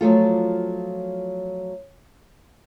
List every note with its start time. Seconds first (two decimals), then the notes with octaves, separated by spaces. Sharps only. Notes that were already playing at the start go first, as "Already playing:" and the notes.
0.01 F3 F#3 A3 F4